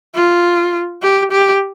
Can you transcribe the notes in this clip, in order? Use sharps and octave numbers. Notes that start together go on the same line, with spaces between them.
F4
G4
G4